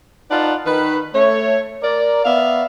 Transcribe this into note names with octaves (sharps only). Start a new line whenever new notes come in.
D#4 F4 B4 D5 F#5 A5
D#3 B4 B5
A3 C#5
A#4 D5
B3 D5 E5 F5